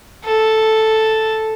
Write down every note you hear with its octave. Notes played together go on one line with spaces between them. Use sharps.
A4